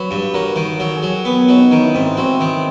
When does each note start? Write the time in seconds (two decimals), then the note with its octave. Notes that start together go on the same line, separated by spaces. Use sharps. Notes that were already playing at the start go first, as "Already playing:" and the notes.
Already playing: F#3 B4
0.11 G2
0.34 F#3 A#4
0.56 D#3
0.80 F#3 A4
0.95 G#4
1.03 F#3
1.10 G4
1.25 B3 G4
1.37 G#4
1.48 F#3 D#4
1.60 C#4
1.71 D#3 D#4
1.83 E4
1.94 G#2 C4
2.06 B3
2.17 F#3 C4
2.41 D#3